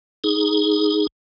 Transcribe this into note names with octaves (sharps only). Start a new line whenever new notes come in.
D#4 G#4